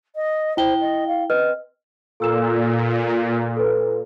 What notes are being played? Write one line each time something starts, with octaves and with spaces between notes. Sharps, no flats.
D#5
E4 C5 G5 G7
D#5
F5
C4 B4 D#5 F6
A#2 A4 E6 E7
A4 B4